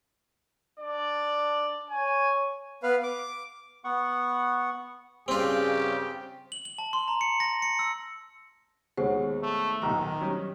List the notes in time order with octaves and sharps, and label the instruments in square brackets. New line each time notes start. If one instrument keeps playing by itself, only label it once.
[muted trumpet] D4 [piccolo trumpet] D5
[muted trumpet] C#5 [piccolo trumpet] G#5
[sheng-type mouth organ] B3 B4 F5
D6
[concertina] B3 F#5 C#6
[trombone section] G2 C#3 [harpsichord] C4 F4 [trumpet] G4
[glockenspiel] F#7
F#7
A5
C6
A#5
C#7
A#6
C#7
E6
[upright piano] D#2 B2 G#3 [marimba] C5 C#5 F#5
[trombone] A3
[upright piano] D#1 B1 A#5 [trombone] D#3
[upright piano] F#3 G3 C#4